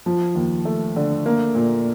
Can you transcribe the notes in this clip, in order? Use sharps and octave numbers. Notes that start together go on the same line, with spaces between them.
F3
D#2
A3
D3
A#3
A#2